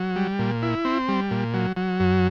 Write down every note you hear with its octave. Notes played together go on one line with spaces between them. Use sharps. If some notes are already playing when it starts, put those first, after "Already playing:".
Already playing: F#3
G3
A#2
E4
C4
G3
A#2
F#3
F#3
F#2